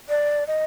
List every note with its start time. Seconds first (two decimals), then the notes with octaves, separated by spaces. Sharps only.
0.09 D5
0.47 D#5